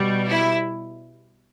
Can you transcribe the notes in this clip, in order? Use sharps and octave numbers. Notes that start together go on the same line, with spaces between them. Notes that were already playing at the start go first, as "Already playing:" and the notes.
Already playing: B2 G3
E4